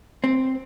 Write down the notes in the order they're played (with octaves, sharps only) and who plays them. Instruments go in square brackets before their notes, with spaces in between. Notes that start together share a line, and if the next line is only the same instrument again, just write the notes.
[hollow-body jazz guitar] C4